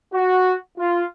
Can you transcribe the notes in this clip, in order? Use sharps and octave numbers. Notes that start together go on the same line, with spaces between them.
F#4
F4